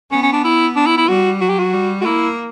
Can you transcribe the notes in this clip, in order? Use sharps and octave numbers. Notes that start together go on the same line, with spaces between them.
B3 C#4
C#4
D4
E4
D4
E4
E4
G3 F#4
F#3 F#4
G4
F#4
G3
F#4
A#3 E4